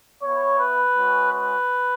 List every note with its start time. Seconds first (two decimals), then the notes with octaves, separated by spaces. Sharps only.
0.22 B3 E4 C#5
0.59 B4
0.96 G#3 C#4 F#4
1.33 B4